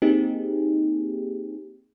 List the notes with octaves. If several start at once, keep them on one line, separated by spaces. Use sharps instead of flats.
A#3 C4 D#4 G4 G#4